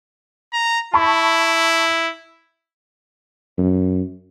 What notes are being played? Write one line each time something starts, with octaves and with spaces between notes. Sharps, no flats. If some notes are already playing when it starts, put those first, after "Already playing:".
A#5
E4 A5 B5 C#6
F#2